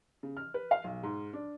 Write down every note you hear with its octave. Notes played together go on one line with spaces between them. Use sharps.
C#3
F6
B4
F5
B1
G#2
D4